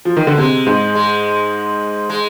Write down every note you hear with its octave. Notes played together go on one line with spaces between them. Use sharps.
F3
D#3
D3
C3 G#3
G#2
G#3
G#3